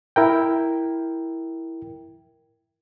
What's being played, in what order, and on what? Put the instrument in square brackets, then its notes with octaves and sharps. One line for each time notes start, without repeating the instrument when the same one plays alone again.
[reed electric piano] E4 A#4 G5